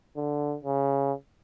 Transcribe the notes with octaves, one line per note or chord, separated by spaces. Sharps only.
D3
C#3